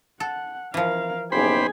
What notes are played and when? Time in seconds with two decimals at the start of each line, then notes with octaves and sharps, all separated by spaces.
0.20 A4 F#5
0.74 E3 F3 A#4 F5
1.32 F#1 B1 G4 G#4 C5 G#5 B5